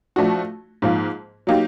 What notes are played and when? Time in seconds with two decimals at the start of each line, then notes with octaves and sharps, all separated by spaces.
0.16 F3 A3 D4 F#4
0.82 G#2 F3 A#3
1.47 F#3 A#3 D#4 G4